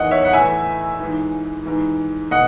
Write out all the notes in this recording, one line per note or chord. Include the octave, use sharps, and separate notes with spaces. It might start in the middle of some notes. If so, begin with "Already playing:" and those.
Already playing: E2 D#3 D#5 F#5
C#5 E5
F#5
A2 E3 E5 G#5
G#2 E3
G#2 E3
B2 D#5 F#5